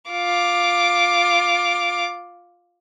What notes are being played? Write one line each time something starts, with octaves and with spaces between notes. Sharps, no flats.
F4 D6